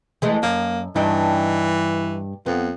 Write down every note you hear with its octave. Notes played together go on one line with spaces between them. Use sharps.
E3 G#3 A3
F#2 A#3
G2 E3 D4 D#4
F2 B3